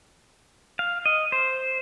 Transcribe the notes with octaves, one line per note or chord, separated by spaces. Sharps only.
F5
D#5
C5